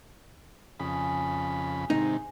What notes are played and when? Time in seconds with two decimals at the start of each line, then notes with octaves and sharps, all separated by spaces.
0.80 F2 C#3 G#4 B5
1.90 G#2 C3 D#3 D#4